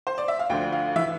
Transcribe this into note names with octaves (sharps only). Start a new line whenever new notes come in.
C5
D5
E5
F5
D2 D3 F3 G5
F5
E3 E5